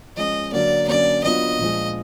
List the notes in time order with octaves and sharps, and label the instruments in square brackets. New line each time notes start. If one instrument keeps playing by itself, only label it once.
[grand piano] F3 G#3 C#4 [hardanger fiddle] D#5
[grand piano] D3 F#3 A#3 [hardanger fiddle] D5
[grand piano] D3 F#3 A#3 C#4 [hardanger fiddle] D5
[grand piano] F#3 B3 D4 F4 [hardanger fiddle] D#5
[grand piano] A#2 F3 G#3